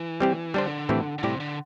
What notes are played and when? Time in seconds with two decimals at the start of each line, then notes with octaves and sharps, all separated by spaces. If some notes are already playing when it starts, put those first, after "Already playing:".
Already playing: E3
0.20 G3 C4 G4
0.54 D3 G3 D4 C5
0.89 A2 E3 C4 E4 G4
1.18 D3
1.23 A2 C3 G3 E4 G4 D5
1.40 D3